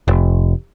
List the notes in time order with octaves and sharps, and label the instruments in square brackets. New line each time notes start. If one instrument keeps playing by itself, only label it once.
[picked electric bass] F1